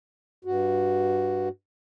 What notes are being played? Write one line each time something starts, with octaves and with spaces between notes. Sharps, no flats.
G2 F#4